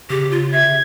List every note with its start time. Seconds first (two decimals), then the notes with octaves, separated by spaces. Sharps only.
0.10 C#3 G4
0.31 F4
0.52 E5 G#6